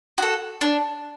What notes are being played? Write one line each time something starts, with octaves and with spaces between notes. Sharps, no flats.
F#4 A4
D4